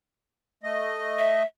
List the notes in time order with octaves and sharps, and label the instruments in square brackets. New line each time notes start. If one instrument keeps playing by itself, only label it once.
[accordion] A3 D#5
[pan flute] E5